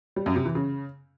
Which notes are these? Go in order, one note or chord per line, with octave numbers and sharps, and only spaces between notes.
G3
F#2
C3
E3
C#3